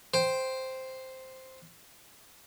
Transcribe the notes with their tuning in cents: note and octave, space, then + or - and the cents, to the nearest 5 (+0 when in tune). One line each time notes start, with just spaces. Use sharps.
C5 +0 G5 +0